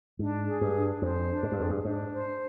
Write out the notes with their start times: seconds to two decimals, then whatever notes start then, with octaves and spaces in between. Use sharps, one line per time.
0.19 G#2 D4
0.47 G#4
0.61 G2
0.75 D4
1.02 F2 C5
1.29 D4
1.43 G#2
1.52 G2
1.57 F2 G#4
1.70 G2
1.84 G#2 D4
2.12 C5